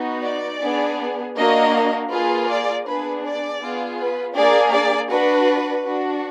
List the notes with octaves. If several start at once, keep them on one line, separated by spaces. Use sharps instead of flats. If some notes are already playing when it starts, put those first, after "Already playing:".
Already playing: B3 D#4 F#4
D5
B3 D4 G#4
A#3 D4 F#4 D#5
A#3 F4 G#4 B4
D5
B3 D4 G#4 B4
D5
B3 F4 G#4
B4
A#3 D4 G#4 D5
D5
D4 F#4 B4
D4 F#4